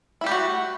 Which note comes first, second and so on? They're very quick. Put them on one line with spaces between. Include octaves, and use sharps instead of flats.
E4 G3 G4 A3 F#4